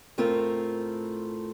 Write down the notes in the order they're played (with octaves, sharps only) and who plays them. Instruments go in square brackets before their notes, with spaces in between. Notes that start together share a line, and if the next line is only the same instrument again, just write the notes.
[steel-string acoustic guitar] A2 A3 C4 F4 A#4